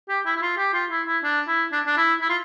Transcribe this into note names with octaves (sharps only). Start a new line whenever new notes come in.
G4
E4
E4
F4
G4
F4
E4
E4
D4
E4
D4
D4
E4
E4
F4